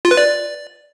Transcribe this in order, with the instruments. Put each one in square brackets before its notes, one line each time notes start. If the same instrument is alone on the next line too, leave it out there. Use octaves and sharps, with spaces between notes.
[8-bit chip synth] F4
B4
D5